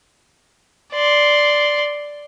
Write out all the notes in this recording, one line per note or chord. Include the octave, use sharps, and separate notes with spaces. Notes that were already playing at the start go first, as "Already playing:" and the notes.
D5 C6